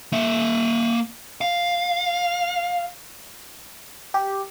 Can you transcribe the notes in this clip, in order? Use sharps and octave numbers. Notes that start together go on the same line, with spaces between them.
A#3 E5
F5
G4